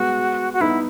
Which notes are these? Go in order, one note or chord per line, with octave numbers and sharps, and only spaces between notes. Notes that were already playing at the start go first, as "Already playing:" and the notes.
Already playing: G#3 B3 F#4
F#4
B3 D#4 E4